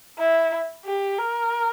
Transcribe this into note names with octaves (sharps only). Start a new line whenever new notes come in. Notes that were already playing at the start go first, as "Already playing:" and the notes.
E4
G4
A#4